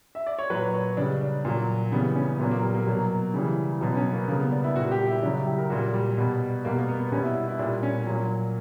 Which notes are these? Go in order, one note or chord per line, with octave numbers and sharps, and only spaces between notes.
E5
D5
C#5
A#2 F#3 B4
C#5
C#3 G3 D4
D4
A#2 F#3
C#3 E3 G3 B3
C#4
A#2 F#3 B3
A#3
G3
A#3
B2 F#3
C#3 E3 G3
B2 F#3 B3
B3
C#4
A#3
C#3 G3 A#3
B3
D4
E4
A#2 G3 F#4
G4
E4
C#3 F#3 D4
E4
G4
A#4
A#2 G3 F#4
G3
B2 G3
B2 G3 A#3
A#3
B3
B2 G3 C#4
E4
E4
A#2 G3 D4
C#4
A#2 F#3